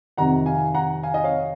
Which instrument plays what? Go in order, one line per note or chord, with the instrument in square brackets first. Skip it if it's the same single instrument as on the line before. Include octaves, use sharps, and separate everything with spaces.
[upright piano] F2 C3 D#3 F#5 A#5
F5 G#5
F#5 A#5
F5 G#5
D#5
C#5 F5